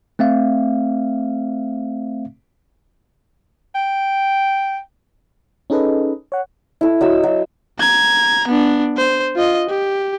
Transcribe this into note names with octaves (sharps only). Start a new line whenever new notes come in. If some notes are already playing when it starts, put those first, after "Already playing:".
A3 C4 E5 F5
G5
C#4 D#4 G#4 A4 B4 D#5
C#5 F#5
E4 A4
F#3 D#5 E6
F#3
A#5 G#6
B3 D4
C5
F4 D#5
G4